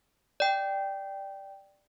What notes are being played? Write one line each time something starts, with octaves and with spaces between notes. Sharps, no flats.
D5 G5